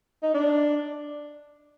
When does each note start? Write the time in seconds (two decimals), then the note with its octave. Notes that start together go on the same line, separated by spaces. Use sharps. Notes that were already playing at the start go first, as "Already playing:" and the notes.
0.23 D#4
0.34 D4